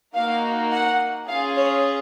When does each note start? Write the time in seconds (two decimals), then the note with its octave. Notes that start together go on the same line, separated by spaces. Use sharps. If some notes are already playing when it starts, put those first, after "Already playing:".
0.14 A#3 D#4 F#4 F5
0.71 F#5
1.28 C#4 F4 G#4 F5
1.56 C#5